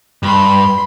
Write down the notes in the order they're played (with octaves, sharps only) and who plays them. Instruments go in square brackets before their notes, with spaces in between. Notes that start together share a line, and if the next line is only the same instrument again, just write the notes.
[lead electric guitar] G2 [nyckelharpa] B5 C6